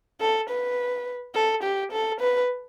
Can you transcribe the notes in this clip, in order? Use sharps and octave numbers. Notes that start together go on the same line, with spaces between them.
A4
B4
A4
G4
A4
B4